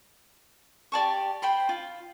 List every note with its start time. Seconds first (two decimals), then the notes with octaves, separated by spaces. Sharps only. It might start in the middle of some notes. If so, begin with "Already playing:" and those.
0.92 G4 D5 A5 C#6
1.42 C5 G5 B5 C6
1.69 F4